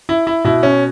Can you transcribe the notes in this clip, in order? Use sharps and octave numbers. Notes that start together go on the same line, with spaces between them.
E4
E4
B2 E4
C#4